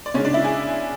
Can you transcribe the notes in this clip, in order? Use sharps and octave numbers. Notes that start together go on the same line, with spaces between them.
D5
C#3 G#3 C#4 D4 C#5
D4 D5
E4 E5
G#4 G#5